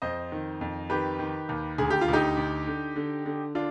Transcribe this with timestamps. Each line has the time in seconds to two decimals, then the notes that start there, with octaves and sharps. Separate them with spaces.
0.02 F2 C5 D#5
0.32 D#3
0.61 F2
0.90 D#3 G4 B4
1.19 D#3
1.49 D#2
1.78 D2 G#4
1.90 G4
2.01 F4
2.08 D2 D#4 G4
2.37 D2
2.67 D3
2.96 D3
3.26 D3
3.55 D3 D4 F4